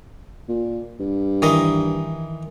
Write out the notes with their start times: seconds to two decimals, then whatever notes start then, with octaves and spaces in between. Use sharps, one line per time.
0.49 A#2
1.00 G2
1.42 D#3 E3 D#5